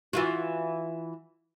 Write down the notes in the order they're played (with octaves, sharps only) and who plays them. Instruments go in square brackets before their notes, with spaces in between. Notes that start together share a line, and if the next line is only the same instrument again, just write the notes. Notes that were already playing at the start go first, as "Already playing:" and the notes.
[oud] E3 F4 F#4